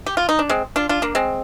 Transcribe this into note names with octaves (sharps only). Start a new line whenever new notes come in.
G4
F4
D#4
D4
G#3 C4
D4 F4
D4 F4
A#3 D4
G#3 C4